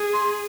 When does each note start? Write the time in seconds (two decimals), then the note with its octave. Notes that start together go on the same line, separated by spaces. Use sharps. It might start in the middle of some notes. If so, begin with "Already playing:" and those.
Already playing: G#4
0.13 C6